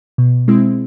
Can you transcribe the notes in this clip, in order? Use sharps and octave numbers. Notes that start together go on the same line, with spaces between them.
B2
G#3 C4 E4